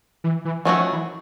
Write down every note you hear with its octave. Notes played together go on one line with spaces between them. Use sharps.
E3
E3
D#3 F3 F#3 A3 C#4 F#4
F3
E3